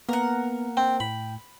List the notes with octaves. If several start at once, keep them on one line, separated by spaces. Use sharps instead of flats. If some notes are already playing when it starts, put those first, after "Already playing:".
A#3 B3 A#4 F#5
C4 G5
A2 B5